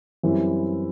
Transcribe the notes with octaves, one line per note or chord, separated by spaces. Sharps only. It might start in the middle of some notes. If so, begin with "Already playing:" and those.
F#2 E3 G3 C4 E4